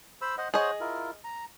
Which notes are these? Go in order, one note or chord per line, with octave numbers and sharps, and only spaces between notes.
C5 B5 E6
C5 D#5 F#5
G#4 C5 C#5 D#5 F#5
E4 F4 A#4
A#5